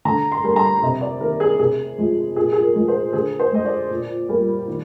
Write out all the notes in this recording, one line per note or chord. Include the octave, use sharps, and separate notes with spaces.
D3 A#5
C6
G3 A#3
A#5
C3 D#5
D5
D#3 A#3 A#4
G#4
C3 G#4
F3 G#3
A#2 G#4
G#4
A#4
F3 G#3
C5
D3 G#4
C5
G#3 D#5
D5
A#2
G3 A#3
D#3